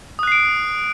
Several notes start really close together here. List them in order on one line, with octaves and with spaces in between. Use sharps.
D#6 F#6 C7 D7